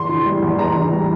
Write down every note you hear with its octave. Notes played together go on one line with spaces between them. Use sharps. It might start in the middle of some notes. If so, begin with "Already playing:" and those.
Already playing: E2 C6
E3
G3
E2
E2 A#5
E3
G3